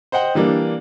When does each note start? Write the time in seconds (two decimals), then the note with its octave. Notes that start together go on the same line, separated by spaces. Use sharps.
0.12 C5 D#5 F#5 G5
0.35 E3 G3 A#3 D4